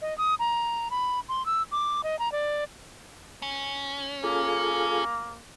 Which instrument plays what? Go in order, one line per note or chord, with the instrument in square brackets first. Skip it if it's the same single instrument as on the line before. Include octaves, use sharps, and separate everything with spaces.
[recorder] D#5
D#6
A#5
B5
C6
E6
D6
D#5
A#5
D5
[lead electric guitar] C#4
[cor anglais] A#3 [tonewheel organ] F4 G#4 A4